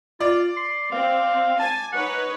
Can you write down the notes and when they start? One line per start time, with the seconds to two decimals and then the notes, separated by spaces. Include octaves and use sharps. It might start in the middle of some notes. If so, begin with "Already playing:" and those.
0.20 F4 D5
0.57 C6
0.92 C4 F5
1.59 G#5 A5
1.93 D#4 B4 C#5 F#5